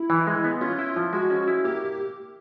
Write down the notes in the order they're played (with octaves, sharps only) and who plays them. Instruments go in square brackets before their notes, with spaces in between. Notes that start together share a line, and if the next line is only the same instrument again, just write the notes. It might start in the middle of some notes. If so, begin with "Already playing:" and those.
Already playing: [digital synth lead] E4
[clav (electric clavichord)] E3
G#3
B3
[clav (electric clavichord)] C#4 [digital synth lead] F4
[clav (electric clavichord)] E4
F3
[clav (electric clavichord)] G#3 [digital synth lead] F#4
[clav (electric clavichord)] C#4
E4
[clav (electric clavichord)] A#3 [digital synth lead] G4